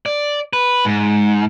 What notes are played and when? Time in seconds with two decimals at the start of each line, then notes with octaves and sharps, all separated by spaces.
0.06 D5
0.53 B4
0.85 G#2